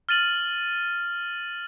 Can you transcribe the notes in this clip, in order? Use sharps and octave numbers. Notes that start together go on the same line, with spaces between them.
F6 A6 D#7 F#7